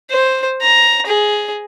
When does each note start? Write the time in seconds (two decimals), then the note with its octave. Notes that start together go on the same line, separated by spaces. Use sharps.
0.10 C5
0.62 A#5
1.06 G#4